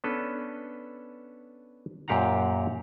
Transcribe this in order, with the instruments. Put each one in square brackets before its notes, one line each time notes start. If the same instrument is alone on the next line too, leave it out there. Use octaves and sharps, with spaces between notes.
[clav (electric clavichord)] B3 C#4 D4 A4 B4
F#2 A#2 G4 F5 F#5 A#5